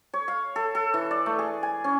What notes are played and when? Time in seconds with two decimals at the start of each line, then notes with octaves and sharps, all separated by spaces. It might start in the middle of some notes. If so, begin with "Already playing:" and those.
0.14 C#5
0.28 F5
0.56 A4
0.75 A4
0.94 E3
1.11 D5
1.26 A3
1.39 G#4
1.63 G#5
1.84 C#4